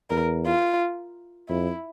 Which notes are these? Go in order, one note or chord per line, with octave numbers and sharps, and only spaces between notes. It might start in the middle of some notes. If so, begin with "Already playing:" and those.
E2 A#4
F4
F2 E4